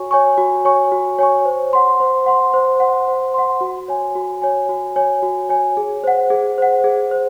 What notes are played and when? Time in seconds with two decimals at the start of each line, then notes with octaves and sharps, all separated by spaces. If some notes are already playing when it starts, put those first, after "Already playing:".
Already playing: F#4 C#5 G#5 C#6
0.11 C#5 G#5 C#6
0.38 F#4
0.65 C#5 G#5 C#6
0.92 F#4
1.18 C#5 G#5 C#6
1.45 C5
1.73 F#5 C6
2.00 C5
2.26 F#5 C6
2.53 C5
2.80 F#5 C6
3.08 C5
3.34 F#5 C6
3.61 F#4
3.88 C#5 G#5
4.15 F#4
4.42 C#5 G#5
4.69 F#4
4.96 C#5 G#5
5.23 F#4
5.49 C#5 G#5
5.77 G#4
6.04 C5 F#5
6.30 G#4
6.58 C5 F#5
6.84 G#4
7.11 C5